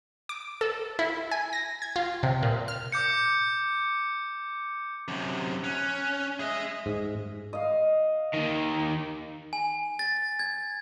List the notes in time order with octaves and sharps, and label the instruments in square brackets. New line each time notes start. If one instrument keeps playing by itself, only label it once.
[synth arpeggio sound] D6
A4
E4
G#5
A#6
G#6
F4
C3
A#2
F6
[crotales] D6 G6 C#7
[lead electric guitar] F#2 C3
[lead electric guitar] C#4 [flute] F#6
[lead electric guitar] G#4 D#5 [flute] E5
[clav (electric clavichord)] G#2
[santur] D#5 F5
[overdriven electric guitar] D#2 D#3
[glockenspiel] G#5
A6
G#6